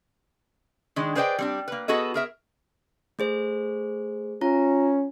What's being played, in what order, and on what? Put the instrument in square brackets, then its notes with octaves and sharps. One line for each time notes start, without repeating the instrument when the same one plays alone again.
[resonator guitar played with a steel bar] D#3 G#3 D4
G#4 B4 C5 D5 D#5 G5
G3 C4 D4
A#3 B4
B3 F#4 G#4 A4 D#5
G#4 A#4 E5
[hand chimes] A3 G#4 C5
[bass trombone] C#4 [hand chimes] F4 A#5